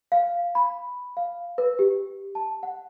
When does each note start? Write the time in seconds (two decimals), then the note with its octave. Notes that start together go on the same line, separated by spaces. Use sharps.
0.12 F5
0.55 B5
1.17 F5
1.58 B4
1.79 G4
2.35 A5
2.63 F#5